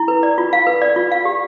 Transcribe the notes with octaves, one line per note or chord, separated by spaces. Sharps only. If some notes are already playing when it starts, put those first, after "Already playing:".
Already playing: E4
B4
D5
F4
F5
B4
D5
F4
F5
G4